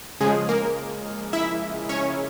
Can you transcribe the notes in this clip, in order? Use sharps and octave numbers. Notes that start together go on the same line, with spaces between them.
C#3 F3 G#3 G#4
A#3 A#4
E4 E5
C#4 C#5